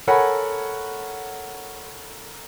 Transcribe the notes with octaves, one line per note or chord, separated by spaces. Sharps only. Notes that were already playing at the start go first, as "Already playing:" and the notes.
A4 A#4 C#5 F#5 G#5 B5